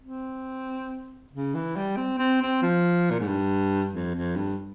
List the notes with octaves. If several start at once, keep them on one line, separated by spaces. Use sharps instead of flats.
C4
C#3
E3
G3
C4
C4
C4
F3
A#2
G#2
G2
F2
F2
G2